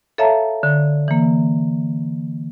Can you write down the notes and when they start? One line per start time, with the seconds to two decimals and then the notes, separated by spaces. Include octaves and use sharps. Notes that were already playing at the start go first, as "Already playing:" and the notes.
0.18 A4 C#5 E5 F5 A5 A#5
0.63 D3
1.08 E3 A#3